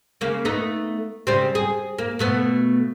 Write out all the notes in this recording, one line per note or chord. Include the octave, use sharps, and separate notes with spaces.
C#3 A#3
A3 B3 D#4
C#3 G3 C4
G#4
A#3
B2 A3 B3